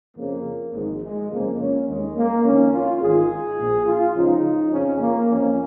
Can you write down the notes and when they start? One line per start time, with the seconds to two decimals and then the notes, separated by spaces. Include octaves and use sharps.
0.17 F2 C#3 F3 A#3
0.74 G#1 G#2 F3 G#3
1.02 G#3
1.31 F2 C#3 F3 A#3
1.60 C#4
1.87 D#2 D#3 G#3
2.16 A#3
2.44 F2 D#3 C#4
2.73 F4
3.01 G#1 G#2 D#3 G#4
3.58 A#1 A#2 F3
3.86 F4
4.15 C#2 C#3 F3 D#4
4.72 F2 C#3 F3 C#4
5.00 A#3
5.28 F2 F3 C#4